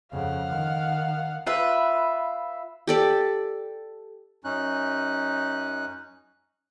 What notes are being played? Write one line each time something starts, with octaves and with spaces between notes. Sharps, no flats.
F2 C#3 F5 F#5
D#3
F4 B4 E5
G4 A4 D5
F#2 C#4 D#4 F#6